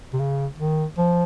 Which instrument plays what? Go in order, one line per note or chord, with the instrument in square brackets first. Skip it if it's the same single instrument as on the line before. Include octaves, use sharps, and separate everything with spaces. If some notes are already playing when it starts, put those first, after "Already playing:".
[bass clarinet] C3
C#3
D#3
F3